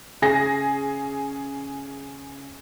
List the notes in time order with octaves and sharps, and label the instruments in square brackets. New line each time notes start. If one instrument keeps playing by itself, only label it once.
[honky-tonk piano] C#3 G#4 A#6